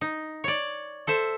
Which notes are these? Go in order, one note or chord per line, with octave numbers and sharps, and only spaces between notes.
D#4
C#5 D5
A4 C5 E5